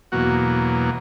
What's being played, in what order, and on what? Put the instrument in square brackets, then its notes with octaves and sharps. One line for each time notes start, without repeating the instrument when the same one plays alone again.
[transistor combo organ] E2 B2 F#3 A#3 F#4